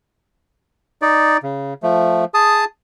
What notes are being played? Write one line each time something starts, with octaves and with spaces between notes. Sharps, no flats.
D#4 D5
C#3
F3 A3
G#4 A5 D#6